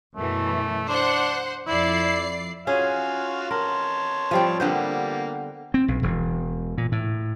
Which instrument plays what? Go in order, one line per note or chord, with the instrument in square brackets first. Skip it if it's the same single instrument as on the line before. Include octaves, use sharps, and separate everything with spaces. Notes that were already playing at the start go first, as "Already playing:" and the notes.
[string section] F#2 B2 E3 [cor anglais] A3
[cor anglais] D4 [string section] C5 F#5
[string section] F2 D5 C7 [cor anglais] E4
[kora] C#4 G#4 [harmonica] F4 F#4 F5
[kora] A#4 [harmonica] C#5 A5 C6
[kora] F3 G3 C4
[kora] D3 B3 C5 [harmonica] G3 A#3
[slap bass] C4
B1
E1
A#2
A2